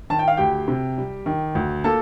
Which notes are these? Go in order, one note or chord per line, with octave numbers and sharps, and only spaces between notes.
D#3 A5
G5
F5
D2 G4 G5
C3
G3
D#3
D2
A#3 A4 A5